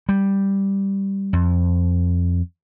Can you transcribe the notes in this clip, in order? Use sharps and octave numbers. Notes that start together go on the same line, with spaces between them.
G3
F2